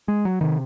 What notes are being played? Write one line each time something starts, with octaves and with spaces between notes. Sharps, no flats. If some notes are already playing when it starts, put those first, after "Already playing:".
G#3
F#3
C3 D#3